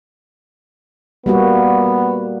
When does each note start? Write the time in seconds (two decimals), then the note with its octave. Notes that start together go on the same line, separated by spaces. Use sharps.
1.26 G3 A#3 B3 F#4